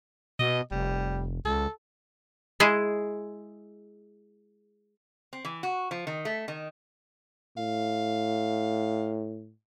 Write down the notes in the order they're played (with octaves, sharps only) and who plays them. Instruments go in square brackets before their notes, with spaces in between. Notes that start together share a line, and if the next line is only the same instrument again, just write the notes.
[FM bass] B2 [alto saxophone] D#5
[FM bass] F1 [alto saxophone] G3
[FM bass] C#2 [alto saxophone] A4
[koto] G#3 E4 G#4
[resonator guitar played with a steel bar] C4
E3
F#4
F3
D#3
A3
D#3
[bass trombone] A2 [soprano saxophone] F5